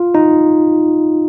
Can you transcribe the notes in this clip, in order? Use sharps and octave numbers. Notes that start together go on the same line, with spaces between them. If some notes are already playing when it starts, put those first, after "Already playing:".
Already playing: F4
D#4